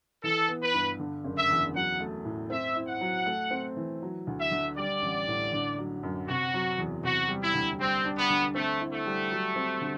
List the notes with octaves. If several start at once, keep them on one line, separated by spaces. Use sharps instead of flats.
E3 A4
B3
B4
G2
D3
F#1
E5
E2
F#3 F#5
A3
A2
C4 E5
E4
F#5
F#3
A3
C4
E3
F#3
D2
E5
D3
G3 D5
A1
A2
D3
F#3
F#2
C3 F#4
F#3
E2
C3 F#4
G3
E4
D2
G3 C4
D4
B3
D3
A3 C4
E4
A3
G3
F#3
C4
D3